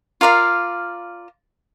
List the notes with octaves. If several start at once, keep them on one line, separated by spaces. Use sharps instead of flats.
F4 A#4 D5 F5